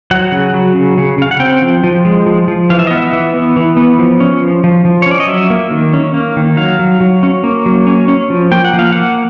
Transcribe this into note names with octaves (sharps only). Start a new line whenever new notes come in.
F#3 F#5
C#3
F#3
C#3
C#3
C#3 F5
F#5
C4 G5
F3
F3
G#3
F3
F3
E3 F5
E5
B3 D#5
E5
E3
B3
E3
B3
F3
C#4
F3
F3
F3
C#5
C#4 D5
D#5
F#3 E5
A#3
D#3
C#4
A#3
D#3
F#3 F5
F#3
F#3
C#4
A#3
F#3
C#4
C#4
F3
A#3 G5
F#5
F3
F5
A#3 F#5